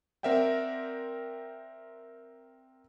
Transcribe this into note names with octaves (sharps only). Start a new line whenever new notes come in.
C4 A#4 D5 E5 F#5 G5